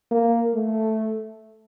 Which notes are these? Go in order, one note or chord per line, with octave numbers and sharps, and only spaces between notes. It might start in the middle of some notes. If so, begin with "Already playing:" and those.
A#3
A3